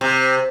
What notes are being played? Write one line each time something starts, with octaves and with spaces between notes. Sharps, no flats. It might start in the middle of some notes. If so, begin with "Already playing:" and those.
C3